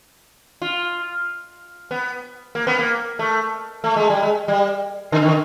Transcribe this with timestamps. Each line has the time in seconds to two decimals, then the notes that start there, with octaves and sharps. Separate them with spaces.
0.62 F4
1.91 B3
2.55 A#3
2.67 B3
2.79 A#3
3.19 A3
3.84 A3
3.96 G#3
4.10 G3
4.23 G#3
4.48 G3
5.12 D3
5.22 D#3
5.29 D3